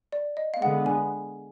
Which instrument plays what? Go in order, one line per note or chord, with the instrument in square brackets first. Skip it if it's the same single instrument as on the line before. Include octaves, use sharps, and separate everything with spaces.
[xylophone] D5
D#5
F5
[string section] D3 G#3 B3 [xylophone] F#5
[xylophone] G#5